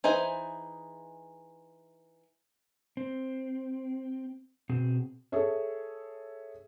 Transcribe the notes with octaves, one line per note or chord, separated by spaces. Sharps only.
E3 D#4 G#4 C5 G#5
C4
B2 C4 G#4
G#4 A4 C#5 E5